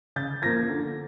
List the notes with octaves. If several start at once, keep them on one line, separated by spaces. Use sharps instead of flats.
C#3 G6 A6
F3 A#3 G#6 A#6
D3